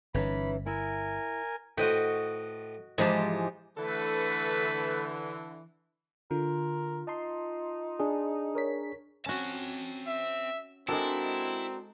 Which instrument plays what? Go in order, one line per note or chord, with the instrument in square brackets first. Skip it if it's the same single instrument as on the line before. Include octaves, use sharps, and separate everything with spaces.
[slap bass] G1 [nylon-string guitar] E3 C#4 D#4 [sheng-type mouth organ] B5
[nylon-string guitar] E4 [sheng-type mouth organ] A#4 G#5
[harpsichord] A2 B4 C5 [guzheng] F#4 D#5 G5
[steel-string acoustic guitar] G#2 E3 G#3 [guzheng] F3 G4 A5 [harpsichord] D#4
[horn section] D3 E3 [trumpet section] A3 B4 [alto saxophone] A4
[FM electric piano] D3 [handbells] F4 [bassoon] A#4
[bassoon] D#4 [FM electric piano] A5 C6
[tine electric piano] D4 G#4
[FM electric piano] A#4 C#5 B6
[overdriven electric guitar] C4 A5 [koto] C#4 F#4
[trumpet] E5
[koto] G#3 A4 [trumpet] C4 [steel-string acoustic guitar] D4 F#4 A#4 [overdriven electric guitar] E4